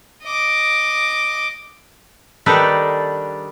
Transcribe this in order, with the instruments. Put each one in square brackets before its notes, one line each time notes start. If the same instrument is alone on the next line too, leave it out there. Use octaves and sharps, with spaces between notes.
[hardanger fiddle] D#5 D6
[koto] D#3 G3 D4 D#4 A4 B4